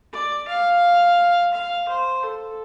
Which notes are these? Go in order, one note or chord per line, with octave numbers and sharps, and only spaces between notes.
D5
F5
F5
C5
A4